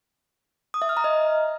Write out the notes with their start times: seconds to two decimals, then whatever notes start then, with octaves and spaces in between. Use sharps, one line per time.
0.74 D#6
0.82 E5
0.89 F6
0.97 A#5
1.04 D#5